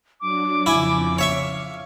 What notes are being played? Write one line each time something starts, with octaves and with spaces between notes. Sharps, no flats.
F#3 D4 D6
F2 C#3 F3 E4 G#5
C#5 E5 F5 C#6